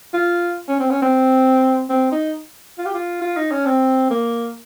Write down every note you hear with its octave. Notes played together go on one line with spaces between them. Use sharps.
F4
C#4
C4
C#4
C4
C4
D#4
F4
G4
F4
F4
D#4
C#4
C4
A#3